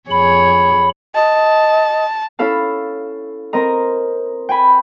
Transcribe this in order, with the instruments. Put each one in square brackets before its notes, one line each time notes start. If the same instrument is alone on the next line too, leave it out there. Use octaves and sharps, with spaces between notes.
[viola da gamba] F2 G#4 C#5 [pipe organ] B5
[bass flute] D#5 [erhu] A5
[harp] C#4 E4 A4 F5 A5
C4 A#4 D#5 A#5
G5 G#5 B5